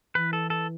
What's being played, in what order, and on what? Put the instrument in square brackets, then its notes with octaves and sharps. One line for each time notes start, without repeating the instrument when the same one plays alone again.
[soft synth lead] E3 [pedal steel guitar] B4
[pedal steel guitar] A4
A4